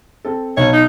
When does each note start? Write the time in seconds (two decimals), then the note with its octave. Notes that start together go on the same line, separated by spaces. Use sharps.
0.25 C4 A4
0.57 B1 C#5
0.73 D#4